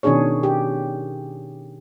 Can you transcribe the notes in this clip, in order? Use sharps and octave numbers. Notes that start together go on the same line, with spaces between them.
B2 D#3 C#4 D4 G#4 C#5
G4